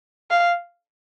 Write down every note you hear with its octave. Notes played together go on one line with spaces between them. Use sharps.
F5